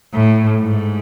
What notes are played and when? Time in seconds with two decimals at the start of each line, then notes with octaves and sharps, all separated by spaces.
0.13 A2
0.61 G#2